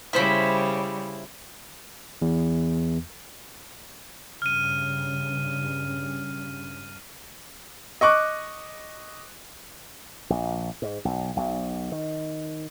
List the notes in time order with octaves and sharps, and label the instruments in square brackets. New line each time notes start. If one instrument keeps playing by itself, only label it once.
[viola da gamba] C#3 G3 [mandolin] E4 C5 B5
[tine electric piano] E2
[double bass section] G2 C#3 [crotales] F6 D#7
[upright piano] D#5 C#6 D6 F#6
[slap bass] A#1
G#2
B1
B1
D#3